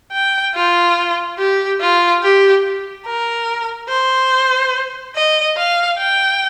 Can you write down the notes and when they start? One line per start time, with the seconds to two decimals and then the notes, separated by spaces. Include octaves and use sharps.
0.12 G5
0.54 F4
1.38 G4
1.80 F4
2.22 G4
3.06 A#4
3.89 C5
5.15 D#5
5.56 F5
5.98 G5